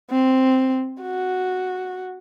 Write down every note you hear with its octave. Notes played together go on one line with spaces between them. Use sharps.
C4
F#4